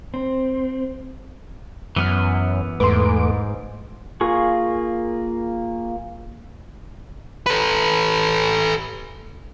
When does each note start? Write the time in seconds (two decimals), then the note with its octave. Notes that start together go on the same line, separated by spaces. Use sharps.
0.14 C4
1.96 F#2 E3 B3 F6
2.80 E2 G#2 A3 B4 C6 D6
4.21 A#3 F4 G#4 C#6
7.46 A4 B4